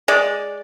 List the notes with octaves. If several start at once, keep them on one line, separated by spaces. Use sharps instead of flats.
G#3 D5